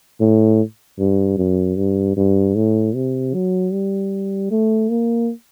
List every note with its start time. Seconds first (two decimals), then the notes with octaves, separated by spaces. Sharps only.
0.21 A2
0.99 G2
1.38 F#2
1.77 G2
2.17 G2
2.55 A2
2.95 C3
3.34 F#3
3.72 G3
4.51 A3
4.90 A#3